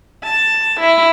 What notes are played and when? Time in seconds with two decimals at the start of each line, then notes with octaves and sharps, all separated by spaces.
0.24 A5
0.80 E4